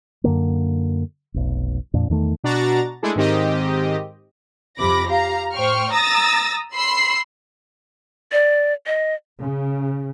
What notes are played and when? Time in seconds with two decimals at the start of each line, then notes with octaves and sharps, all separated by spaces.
0.24 F#2 D3 A#3
1.34 F1 B1
1.94 F2 A#2 D4
2.10 E2 D#3 A3
2.44 B2 D4 F#4 A#5 A6
3.02 G#3 A3 D4 E4 G#4 A4
3.16 G#2 D#3 C4 G4 D#5
4.79 F2 C3 B5 D6 A#6
5.08 G4 F5 A#5
5.53 A2 C5 G5 C#6 F6
5.93 A#5 D#6 E6 A6 A#6
6.75 B5 C6 E6 C7
8.32 D5
8.86 D#5
9.42 C#3